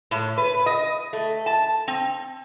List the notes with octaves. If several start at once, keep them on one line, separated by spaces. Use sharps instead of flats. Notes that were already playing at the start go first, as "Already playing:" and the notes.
A2
B4
D#5
A3
A5
C4